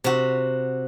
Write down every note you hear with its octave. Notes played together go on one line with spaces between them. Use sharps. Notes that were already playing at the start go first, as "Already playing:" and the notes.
C3 F#4